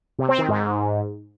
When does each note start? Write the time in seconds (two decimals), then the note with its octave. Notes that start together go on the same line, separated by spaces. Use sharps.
0.19 C3
0.29 C4
0.39 D#3
0.49 G#2